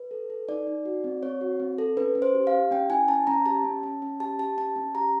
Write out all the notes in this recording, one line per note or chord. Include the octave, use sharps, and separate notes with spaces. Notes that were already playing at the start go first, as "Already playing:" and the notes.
Already playing: B4
A4
A4
D#4 D5
D#4
F#4
C4
C4 C#5
F#4
C4
A4
C#4 B4
C#4
C5
G4
F5
G4
C#4 G5
E4 G#5
C#4 A5
C#4 A#5
G4 A5
C#4
C#4
C#4
G4 A5
G4 A5
C#4 A5
C#4
G4 A#5